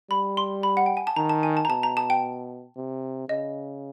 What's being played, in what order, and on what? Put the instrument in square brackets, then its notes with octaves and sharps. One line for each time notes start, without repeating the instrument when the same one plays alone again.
[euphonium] G3 [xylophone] B5
[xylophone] C6
B5
F#5
G5
G#5
A5
[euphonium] D#3 [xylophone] A#5
[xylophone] A5
G#5
A5
A#5
[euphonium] B2 [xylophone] A5
[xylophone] A#5
A5
G5
[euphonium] C3
[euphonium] C#3 [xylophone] D#5